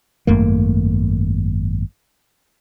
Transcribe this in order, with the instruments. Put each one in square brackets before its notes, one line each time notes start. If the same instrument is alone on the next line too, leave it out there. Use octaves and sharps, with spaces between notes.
[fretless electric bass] G#1 F#2 A3 A#3